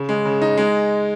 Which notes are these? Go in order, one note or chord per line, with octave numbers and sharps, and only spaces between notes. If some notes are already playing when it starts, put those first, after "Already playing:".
Already playing: C#3
G#3
C#3
D#4
G#3